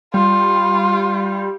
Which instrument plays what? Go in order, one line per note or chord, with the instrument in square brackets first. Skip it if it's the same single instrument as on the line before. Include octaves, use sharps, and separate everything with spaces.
[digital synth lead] G3 [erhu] F4